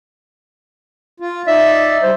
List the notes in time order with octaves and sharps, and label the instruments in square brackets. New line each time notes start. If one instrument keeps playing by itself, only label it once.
[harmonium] F4
[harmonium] D#4 D5 [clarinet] E5
[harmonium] G3 [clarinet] C5